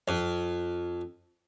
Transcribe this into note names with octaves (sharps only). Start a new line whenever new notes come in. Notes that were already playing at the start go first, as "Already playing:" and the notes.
F2